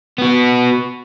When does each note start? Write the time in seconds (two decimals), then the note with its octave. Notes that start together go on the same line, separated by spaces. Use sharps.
0.18 B3 F#4